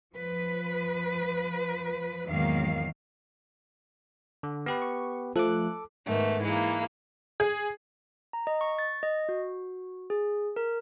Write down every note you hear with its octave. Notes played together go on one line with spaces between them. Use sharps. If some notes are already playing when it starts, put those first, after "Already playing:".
F3 B4
E2 G#2 D#3 F#3 A#3 F5
D3
B3 G4 B4
C#6
F3 A3 A4 D6 F#6
G#2 D#3 A3 B3
E3 G#3 A#3
G#4
A#5
D#5
C#6
A6
D#5
F#4
G#4
A#4